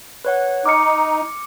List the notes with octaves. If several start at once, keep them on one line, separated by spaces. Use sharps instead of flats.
B4 C#5 F#5
D#4 D6 F6 C#7